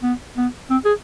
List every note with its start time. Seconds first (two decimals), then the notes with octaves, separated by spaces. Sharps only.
0.03 B3
0.37 B3
0.70 C4
0.85 G#4